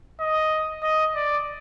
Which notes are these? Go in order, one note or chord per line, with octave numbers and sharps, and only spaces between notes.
D#5
D#5
D5